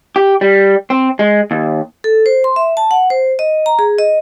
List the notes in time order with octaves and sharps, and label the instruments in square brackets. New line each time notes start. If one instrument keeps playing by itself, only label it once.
[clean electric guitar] G4
G3
C4
G#3
D#2
[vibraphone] A4
C5
C6
E5
A5
F#5
C5
D#5
A#5
G#4
D#5